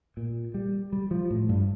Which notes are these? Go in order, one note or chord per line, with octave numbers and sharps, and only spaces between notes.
A#2
G3
G3
F3
A2
G2